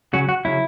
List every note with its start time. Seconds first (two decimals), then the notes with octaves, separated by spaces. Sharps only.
0.13 C#3 F#3 C#4 F#4
0.29 F#4
0.45 C#3 F#3 C#4 E4